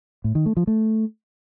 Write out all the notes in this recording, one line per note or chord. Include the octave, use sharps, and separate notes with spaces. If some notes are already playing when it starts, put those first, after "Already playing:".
A2
D#3
A3
F3
A3